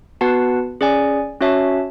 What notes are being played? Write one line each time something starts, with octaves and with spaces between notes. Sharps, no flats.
B3 F#4 B4 F#5 A5
C#4 G#4 D5 G#5
C#4 F#4 C#5 E5 A5